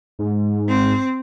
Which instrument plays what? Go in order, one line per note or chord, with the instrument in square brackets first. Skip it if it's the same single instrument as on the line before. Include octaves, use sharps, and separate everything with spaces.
[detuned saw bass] G#2
[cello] C4